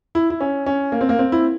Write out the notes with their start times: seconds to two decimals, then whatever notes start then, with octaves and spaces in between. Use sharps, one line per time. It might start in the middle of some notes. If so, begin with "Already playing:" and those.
0.15 E4
0.30 E4
0.41 C#4
0.66 C#4
0.92 A#3
1.01 C4
1.09 A#3
1.19 C4
1.32 E4